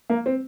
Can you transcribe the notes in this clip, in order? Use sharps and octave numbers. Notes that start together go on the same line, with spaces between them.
A#3
C4